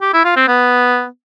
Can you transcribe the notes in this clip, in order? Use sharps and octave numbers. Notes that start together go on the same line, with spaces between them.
G4
E4
F4
C4
B3